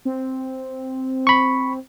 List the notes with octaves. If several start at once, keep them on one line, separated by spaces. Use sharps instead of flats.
C4
B5 C#6